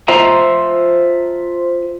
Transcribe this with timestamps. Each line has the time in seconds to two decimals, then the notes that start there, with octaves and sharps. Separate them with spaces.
0.08 F4 C5 E5 A#5